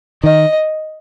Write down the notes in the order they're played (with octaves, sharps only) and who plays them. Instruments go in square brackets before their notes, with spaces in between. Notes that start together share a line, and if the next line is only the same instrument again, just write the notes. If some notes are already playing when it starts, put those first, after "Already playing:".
[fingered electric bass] D#3 [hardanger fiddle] D#5